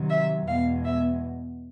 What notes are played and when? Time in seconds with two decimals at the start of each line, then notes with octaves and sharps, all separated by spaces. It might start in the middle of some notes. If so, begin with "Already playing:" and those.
Already playing: C3 D#3 F#3
0.09 E5
0.47 E2 B2 G#3 F5
0.85 E5